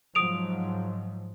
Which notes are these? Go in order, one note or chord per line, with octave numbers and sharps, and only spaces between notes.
G#2 F3 F#3 D#6 D7 F7